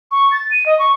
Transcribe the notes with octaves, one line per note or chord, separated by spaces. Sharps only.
C#6
A6
D#7
D#5
C#6